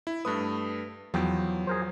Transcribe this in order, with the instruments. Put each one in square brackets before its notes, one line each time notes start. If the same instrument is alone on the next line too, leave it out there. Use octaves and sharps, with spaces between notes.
[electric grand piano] E4
[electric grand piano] G2 A3 D#6 [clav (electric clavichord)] B4
[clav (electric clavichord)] E2 G5 [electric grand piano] F3 F#3
[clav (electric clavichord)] G#4 A#4 C5